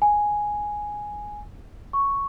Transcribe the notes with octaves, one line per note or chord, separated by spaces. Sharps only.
G#5
C#6